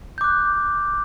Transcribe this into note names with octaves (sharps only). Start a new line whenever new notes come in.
D6 F#6 G6